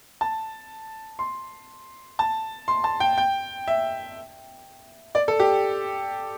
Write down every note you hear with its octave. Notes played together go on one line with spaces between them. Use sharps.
A5
C6
A5
C6
A5
G5
G5
E5
D5
A4
G4